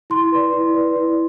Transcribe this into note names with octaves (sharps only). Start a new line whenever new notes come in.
E4 C6
B4 D5
E4
B4 D5
E4